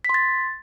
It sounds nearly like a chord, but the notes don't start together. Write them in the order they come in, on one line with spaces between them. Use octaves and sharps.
B6 C6 A6